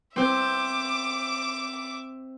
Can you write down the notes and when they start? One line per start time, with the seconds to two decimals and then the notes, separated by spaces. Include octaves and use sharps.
0.16 C4 C5 E5 D6